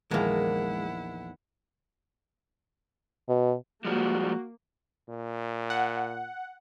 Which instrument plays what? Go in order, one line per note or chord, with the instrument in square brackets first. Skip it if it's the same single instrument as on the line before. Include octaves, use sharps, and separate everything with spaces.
[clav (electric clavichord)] A#1 A5 [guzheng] E2 D#3 [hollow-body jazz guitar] G#3 A#3 [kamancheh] E4 F#5
[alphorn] B2
[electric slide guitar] F3 G3 G#3 [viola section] A#3 [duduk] F#4
[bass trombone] A#2
[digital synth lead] F#5